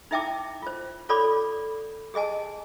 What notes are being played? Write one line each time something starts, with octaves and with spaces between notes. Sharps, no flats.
D#4 E4 E5 G5 A5 D6
F4 C5
F4 A4 C#5 D5 B5 D6
G4 G#4 D#5 G#5 A5